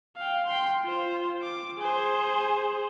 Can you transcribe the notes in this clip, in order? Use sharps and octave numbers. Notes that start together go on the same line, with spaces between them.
F5 G5
G5 C6
F4 C5
D6
G#4 C5